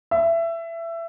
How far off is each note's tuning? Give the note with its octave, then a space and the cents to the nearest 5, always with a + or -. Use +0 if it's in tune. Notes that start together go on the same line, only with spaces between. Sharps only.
E5 +20